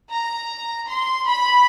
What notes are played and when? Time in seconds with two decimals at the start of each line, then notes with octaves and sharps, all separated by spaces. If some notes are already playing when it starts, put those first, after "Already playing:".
0.11 A#5
0.89 C6
1.28 B5